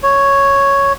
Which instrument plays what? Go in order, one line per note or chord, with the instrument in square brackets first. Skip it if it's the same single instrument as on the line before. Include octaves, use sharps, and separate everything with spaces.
[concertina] C#5